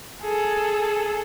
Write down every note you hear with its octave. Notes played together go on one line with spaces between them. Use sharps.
G#4 A4